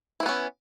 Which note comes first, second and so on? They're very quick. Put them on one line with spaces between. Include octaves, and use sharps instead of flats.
E4 E3 B3 C#4